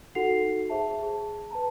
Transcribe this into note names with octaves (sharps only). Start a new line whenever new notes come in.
D#4 F#4 A4 F#5 C7 F7
G#4 C5 E5 A5
G#4 A5
B4 A5 A#5